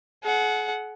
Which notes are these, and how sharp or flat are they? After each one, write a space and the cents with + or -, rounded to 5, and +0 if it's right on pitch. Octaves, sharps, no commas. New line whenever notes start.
G#4 +45 F#5 +0